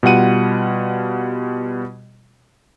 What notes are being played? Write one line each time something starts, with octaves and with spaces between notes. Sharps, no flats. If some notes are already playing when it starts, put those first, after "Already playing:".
B2 G3 F4 F#5 D#7